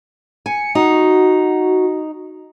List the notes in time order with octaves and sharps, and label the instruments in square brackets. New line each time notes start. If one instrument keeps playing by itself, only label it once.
[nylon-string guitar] G#5 [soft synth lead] C#7
[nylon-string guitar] D#4 [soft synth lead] F#4